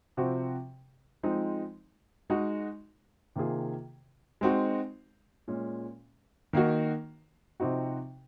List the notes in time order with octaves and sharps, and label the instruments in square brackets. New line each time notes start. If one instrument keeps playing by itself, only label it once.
[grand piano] C3 F3 C4 F#4
F3 G#3 C4 D#4
G#3 D#4 F#4
C3 D#3 A#3 F4 G#4
G#3 C4 D#4 F#4
A#2 G#3 C#4
D#3 A#3 D#4 F#4
C3 F3 C4 D#4 F#4